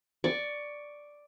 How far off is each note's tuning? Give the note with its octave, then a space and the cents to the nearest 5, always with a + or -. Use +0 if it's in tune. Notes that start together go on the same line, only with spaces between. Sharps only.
D5 +0 C#6 +10